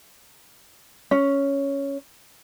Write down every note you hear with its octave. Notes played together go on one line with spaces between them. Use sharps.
C#4